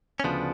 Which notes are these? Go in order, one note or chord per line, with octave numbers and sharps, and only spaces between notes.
C#4
D2 C#3 F3 B3 D4